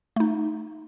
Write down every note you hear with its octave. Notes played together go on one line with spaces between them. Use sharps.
A3 D#4